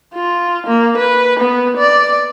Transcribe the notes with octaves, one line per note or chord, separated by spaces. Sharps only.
F4
A#3
B4
B3
D5